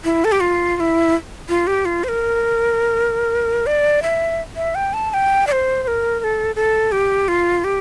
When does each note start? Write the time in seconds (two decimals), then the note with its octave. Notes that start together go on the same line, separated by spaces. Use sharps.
0.04 E4
0.25 A4
0.32 G4
0.40 F4
0.77 F4
0.80 E4
1.49 F4
1.67 G4
1.85 F4
2.04 C5
2.08 A#4
3.66 D5
4.03 E5
4.56 E5
4.75 G5
4.93 A5
5.10 A5
5.14 G5
5.47 D5
5.52 C5
5.83 C5
5.88 A#4
6.20 A#4
6.24 A4
6.56 A4
6.92 G4
7.28 F4
7.64 G4